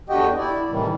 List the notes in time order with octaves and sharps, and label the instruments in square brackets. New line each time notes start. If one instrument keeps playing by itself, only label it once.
[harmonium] E2 D3 F#4 G4 D#5 G5
E4 D5
A2 C3 D#3 E3 G3